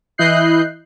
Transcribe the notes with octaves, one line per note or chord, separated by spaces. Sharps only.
E3 E4 D#5 F#6 G6 C7